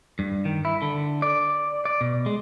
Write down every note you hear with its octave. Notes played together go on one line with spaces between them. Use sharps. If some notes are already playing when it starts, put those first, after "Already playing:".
G2
D#3
E4
D3
D5
D5
B2
G#3